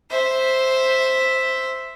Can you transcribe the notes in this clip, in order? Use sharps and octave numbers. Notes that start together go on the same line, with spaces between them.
C5 E5